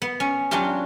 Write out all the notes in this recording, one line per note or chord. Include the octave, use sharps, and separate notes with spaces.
B3
C#4
F#3 C#4 D4 F4 G4